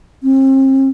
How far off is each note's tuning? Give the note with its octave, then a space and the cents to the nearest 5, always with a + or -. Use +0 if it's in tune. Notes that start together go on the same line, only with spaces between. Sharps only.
C4 +40